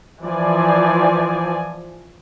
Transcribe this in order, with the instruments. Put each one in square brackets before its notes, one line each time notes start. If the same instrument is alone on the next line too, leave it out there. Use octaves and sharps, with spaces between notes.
[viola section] E3 F3 D5 G#5